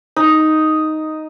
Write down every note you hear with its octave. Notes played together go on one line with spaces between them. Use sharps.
D#4